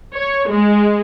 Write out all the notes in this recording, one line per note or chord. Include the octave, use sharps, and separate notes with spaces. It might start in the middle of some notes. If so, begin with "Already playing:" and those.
C#5
G#3